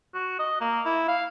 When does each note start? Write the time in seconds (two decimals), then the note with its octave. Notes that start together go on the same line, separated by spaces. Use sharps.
0.14 F#4
0.39 D#5
0.61 A#3
0.85 E4
1.08 F5